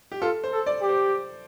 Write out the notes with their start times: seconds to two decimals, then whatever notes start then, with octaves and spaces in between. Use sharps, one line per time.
0.12 G4
0.21 F4 A4
0.44 C5
0.51 A4
0.66 D5
0.82 G4
0.89 C5